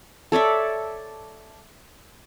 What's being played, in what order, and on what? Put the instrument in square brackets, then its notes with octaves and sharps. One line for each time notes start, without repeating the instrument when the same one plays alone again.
[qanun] A4 C#5 D5 E5